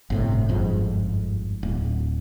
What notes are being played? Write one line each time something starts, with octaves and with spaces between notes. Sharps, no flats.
G1 A2 C3
G1 F2 G#2
D1